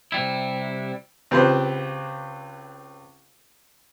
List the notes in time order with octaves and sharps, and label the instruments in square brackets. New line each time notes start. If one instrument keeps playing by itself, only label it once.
[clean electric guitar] C3 G3 E4
[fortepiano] C#2 C4 G4 B4 C5 C6